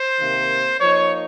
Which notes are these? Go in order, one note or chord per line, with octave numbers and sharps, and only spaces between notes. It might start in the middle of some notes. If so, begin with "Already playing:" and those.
Already playing: C5
C3 D#3 A#3
F3 A#3 D#4 C#5